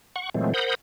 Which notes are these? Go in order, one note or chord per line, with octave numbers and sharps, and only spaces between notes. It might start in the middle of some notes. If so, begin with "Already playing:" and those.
F#5 C#6
A#2 E3 F#3 G#3 A3 C4
A#4 C5 F#5 B5 D#6 G6